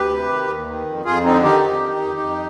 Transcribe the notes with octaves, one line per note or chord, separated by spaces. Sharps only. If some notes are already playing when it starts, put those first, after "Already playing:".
Already playing: D2 G4 B4
C3
D#3
D#2
D#3
F2
F2 F4 G#4
D3 C4 D#4
D#3 D#4 G4
F2
D#3
F2
F2